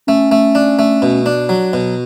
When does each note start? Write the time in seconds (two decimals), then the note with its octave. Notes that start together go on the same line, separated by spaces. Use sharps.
0.07 A3 C#4
0.32 A3
0.55 D4
0.79 A3
1.02 B2
1.26 D4
1.49 F#3
1.73 B2